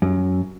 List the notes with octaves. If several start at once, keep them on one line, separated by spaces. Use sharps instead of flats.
F#2